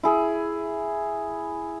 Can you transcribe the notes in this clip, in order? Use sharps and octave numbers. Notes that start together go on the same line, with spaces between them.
E4 G#4